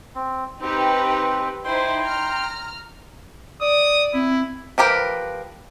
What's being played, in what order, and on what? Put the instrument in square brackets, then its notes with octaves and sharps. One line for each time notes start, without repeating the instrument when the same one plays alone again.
[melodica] C4
[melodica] C4 [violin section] D#4 G4 B4
[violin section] D#4 E4 C5 [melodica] G5 C6
[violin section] A#5 F6
[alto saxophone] D5 [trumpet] D#6
[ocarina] C4 [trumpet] E4
[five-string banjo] F3 G4 A#4 B4